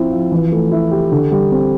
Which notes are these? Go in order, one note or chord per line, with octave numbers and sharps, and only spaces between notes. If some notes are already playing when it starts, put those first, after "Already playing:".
Already playing: F3 C4 E4
F3
E3
A3
E4
G4
D3
G3
C4